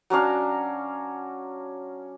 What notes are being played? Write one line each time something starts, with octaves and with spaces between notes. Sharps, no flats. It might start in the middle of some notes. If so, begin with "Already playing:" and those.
F#3 C#4 D4 F5